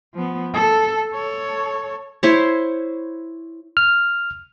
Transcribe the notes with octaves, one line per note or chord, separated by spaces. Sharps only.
F3 B3
A4
A4 C#5
E4 C5 C#5
F6